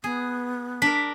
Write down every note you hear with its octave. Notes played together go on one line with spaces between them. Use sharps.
B3 G#4
D4 A#4 B6